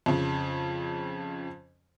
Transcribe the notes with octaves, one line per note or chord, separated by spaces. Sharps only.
F2 C#3